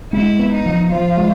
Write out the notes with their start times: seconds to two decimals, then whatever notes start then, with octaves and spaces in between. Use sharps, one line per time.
0.13 G#3 E4
0.39 B3
0.52 D#4
0.66 F3
0.92 F3 F4
1.17 G#3